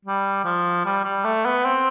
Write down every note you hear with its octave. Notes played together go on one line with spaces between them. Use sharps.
G3
F3
G3
G3
A3
B3
C4